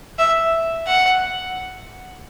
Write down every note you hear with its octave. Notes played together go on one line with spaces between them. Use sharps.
E5
F#5